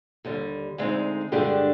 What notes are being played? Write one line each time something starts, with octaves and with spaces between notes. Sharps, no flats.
D#2 D3 G3
D2 D3 G#3 C4 D#4
G2 D3 G#3 D4 G4